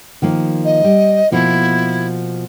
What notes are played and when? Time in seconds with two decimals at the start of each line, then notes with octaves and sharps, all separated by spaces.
0.22 D#3 F3 A#3
0.64 D#5
0.84 G3
1.32 B2 F3 A#3 E4